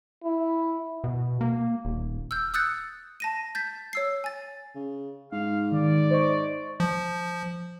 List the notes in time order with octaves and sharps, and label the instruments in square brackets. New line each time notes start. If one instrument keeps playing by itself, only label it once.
[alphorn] E4
[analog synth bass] B2
A#3
D#1
[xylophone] E6 F6 G6
D#6 E6 F#6 G6 A6 C#7
A5 A#6 D#7
G6 A6 B6
C#5 E6 C7
G#5 A6
[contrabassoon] C#3
[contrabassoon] G#2 [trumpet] F5
[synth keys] D#3 [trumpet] D5
[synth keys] C5 D#5 C#6
[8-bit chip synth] F3